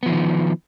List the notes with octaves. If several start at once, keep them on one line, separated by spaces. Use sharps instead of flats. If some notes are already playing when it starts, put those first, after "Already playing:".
D#3 F3 B3